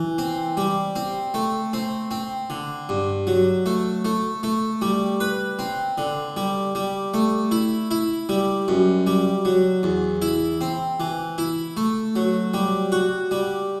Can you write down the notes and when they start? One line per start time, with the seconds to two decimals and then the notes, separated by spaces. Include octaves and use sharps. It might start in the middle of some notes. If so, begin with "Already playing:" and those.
Already playing: E3
0.18 C4
0.57 G3
0.96 C4
1.34 A3
1.73 C4
2.11 C4
2.50 D3
2.89 G2
3.27 F#3
3.66 A3
4.05 A3
4.43 A3
4.82 G3
5.20 B4
5.59 C4
5.98 D3
6.37 G3
6.75 G3
7.14 A3
7.51 E4
7.91 E4
8.29 G3
8.68 F#2
9.07 G3
9.45 F#3
9.83 E2
10.22 E4
10.61 C4
11.00 E3
11.38 E4
11.77 A3
12.16 F#3
12.54 G3
12.92 F#4
13.31 G3